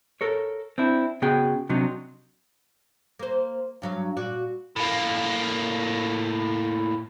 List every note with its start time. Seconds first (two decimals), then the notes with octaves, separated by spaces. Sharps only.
0.21 A4 A#4 C#5
0.78 C4 D4 E4
1.22 C#3 B3 F#4 G#4 G5
1.69 C3 F#3 D4 D#4
3.19 A#3 C5
3.82 G2 F#3 F5
4.17 A#2 F#4 D5
4.76 A2 A#3